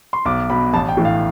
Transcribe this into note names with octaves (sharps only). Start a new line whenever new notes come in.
C6
B1 D6
B2 B5
A1 A5
G5
A2 E3
F5